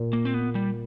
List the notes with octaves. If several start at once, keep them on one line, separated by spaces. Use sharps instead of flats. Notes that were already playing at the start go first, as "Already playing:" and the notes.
Already playing: A#2
A#3
C4
B3
G3